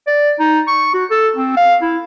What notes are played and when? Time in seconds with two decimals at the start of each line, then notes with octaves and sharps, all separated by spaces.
0.07 D5
0.39 D#4
0.67 C#6
0.94 F#4
1.11 A4
1.36 C4
1.57 F5
1.82 E4